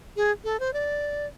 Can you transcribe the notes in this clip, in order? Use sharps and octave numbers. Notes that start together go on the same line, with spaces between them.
G#4
A4
C5
D5